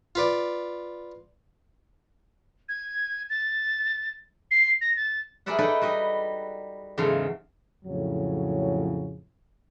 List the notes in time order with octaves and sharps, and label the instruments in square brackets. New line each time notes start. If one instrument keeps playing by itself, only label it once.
[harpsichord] F4 B4 D5
[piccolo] G#6
A6
C7
A#6
A6
[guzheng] G#4 A#4 B4 D5 E5 F#5
D#4 E4 A4 B4 D5 D#5
G3 F#4 D#5
E2 G#2 C#3 F#3 A4 F5
[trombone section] F2 A2 C#3 F#3